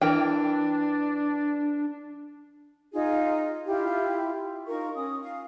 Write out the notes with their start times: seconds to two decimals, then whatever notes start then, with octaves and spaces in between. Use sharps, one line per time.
0.01 E3 D4 A#4 G5
2.93 D#4 F4 G#4
3.66 E4 F4 G4
4.68 D#4 F4 A#4 C#6
4.95 C#4 D#6
5.23 F5